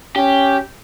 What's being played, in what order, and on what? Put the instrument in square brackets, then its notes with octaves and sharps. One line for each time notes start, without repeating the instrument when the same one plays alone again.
[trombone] C#4 [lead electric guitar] G4